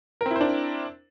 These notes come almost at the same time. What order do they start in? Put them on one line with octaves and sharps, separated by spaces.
A#4 C4 E4 C5 D4